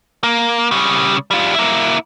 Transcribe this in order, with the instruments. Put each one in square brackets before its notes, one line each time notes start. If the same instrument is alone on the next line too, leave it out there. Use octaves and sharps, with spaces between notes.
[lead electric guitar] A#3
C#3 G3
G3 F4
A#3 E4